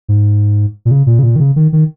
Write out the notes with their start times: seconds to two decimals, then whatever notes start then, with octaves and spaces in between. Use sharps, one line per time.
0.09 G#2
0.85 A#2
0.91 C#3
1.06 A#2
1.19 C#3
1.23 A#2
1.36 D#3
1.40 C#3
1.56 D#3
1.73 D#3